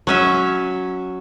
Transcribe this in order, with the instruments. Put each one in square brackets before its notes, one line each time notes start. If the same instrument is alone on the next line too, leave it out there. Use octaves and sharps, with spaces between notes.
[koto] F#3 C#4 E5